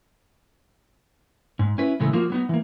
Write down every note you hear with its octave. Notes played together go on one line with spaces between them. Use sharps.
G#2
C#4 E4 B4
A2 C#3 E3 G#3 A4
F3 A#3 F4 F#4 A#4
F#3 B3 D#4
E3 A#3